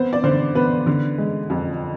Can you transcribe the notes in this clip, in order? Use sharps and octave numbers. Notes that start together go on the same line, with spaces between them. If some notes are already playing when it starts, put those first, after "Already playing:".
Already playing: B3 C4 C5
D5
D3 C5
B3 B4
D3
G#3
F2